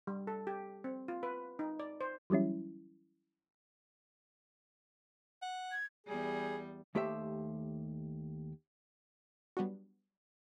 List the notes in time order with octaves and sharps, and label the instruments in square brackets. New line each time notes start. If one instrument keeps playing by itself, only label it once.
[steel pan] G3
A4
G4
C4
F4
B4
D#4
D5
C5
[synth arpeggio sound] E3 F#3 G3 C#4 E4
[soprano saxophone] F#5
[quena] G#6
[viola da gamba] E2 G3 [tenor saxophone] G#4
[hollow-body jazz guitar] D#2 A3 G4 C5 E5
[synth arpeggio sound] F#3 G3 B3 D4 F#4